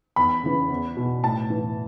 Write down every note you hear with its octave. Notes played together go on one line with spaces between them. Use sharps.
E2 B5
C#3 E3
E2
B2
A2 A5
E3